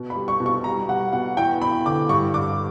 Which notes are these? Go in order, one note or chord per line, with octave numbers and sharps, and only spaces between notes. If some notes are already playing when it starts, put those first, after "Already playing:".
Already playing: B2
B5
G3
C#6
B2
C#6
G3 A#5
G3 F#5
B2 F#5
E2 G5
E2 B5
D3 D6
G2 C#6
G2 D6